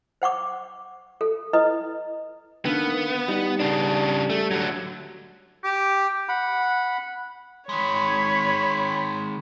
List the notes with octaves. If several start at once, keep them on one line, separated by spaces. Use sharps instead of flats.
C5 F#5 C#6 D6
A4
E4 B4 D#5 D#6
D3 D#3 A#3 B3
G3 D#4
C#3 D4
A3
D3 F#3
G4
F#5 B5
D#3 G#3 C#5 B5